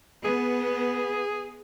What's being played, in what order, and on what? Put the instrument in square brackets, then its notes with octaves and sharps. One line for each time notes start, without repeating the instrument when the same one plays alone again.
[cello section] B3 [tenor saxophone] G#4